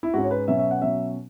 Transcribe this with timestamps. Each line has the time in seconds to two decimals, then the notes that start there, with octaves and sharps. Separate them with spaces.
0.03 E4
0.14 G#2 G#3 C#4 F#4
0.24 C#5
0.31 B4
0.48 B2 F#3 C#4 E5
0.59 E5
0.71 F#5
0.81 B2 F#3 C#4 E5